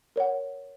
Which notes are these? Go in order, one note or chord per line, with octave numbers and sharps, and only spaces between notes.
A#4 C#5 F#5